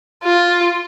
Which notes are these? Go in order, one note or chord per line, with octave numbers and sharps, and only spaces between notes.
F4